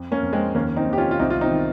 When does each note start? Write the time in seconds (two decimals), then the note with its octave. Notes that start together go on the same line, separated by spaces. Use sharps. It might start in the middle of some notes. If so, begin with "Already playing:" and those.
Already playing: F2
0.12 A#3 C#4
0.23 F2
0.33 G#3 C4
0.55 D#2 A#3 C#4
0.76 C4 D#4
0.87 D#2
0.93 G4
0.98 C#4 F4
1.11 F4
1.19 C2 C4 D#4
1.30 F4
1.41 C4 D#4
1.51 D#3